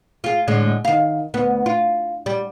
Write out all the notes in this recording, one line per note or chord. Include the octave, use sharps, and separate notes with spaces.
F4 G#4
A2 D3 G#3
D#3 F5
D2 B3
F4
G3